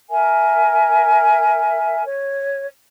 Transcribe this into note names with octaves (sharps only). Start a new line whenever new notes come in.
A#4 E5 G#5
C#5